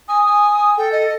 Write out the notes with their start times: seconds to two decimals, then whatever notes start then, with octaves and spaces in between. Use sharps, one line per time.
0.08 G#5 D#6
0.25 G#5
0.77 A4 G5
0.92 D#5